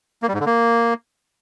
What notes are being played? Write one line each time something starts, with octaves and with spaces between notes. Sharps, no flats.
A#3
G3
G#2
D3
A#3